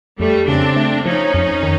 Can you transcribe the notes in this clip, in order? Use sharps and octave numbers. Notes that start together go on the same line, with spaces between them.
F2 G3 A3
C#3 C4 D4
A3
F3 C#4 D#4
F2
D#3